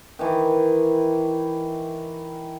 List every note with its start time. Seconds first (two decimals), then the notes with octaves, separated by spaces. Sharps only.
0.19 D#3 E3